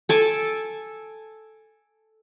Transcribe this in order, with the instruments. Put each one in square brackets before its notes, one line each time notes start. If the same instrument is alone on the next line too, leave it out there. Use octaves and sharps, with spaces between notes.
[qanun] A4 G#5 D6